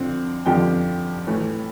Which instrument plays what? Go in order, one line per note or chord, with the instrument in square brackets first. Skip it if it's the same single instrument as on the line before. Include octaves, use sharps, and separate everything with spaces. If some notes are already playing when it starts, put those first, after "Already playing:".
Already playing: [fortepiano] F2 D3 F3 C4
F2 D3 F3 G4 G5
A2 E3 A3